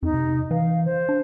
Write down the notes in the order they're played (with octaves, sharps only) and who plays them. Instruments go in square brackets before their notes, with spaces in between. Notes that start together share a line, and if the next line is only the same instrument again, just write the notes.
[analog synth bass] F2 [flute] D#4
[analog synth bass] C3
[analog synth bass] E3 [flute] F5
[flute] C5
[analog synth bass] D4